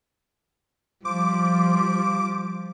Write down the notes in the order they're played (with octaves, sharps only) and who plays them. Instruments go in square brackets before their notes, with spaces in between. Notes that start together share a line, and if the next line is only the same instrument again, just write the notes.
[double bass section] F3 [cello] G3 [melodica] F4 C5 [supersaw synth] D6